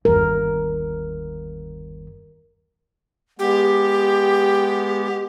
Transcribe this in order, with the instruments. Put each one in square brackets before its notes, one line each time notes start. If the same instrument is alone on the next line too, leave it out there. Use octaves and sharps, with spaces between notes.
[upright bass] G1 D#2 [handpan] A#4
[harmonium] G#3 B3 [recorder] G4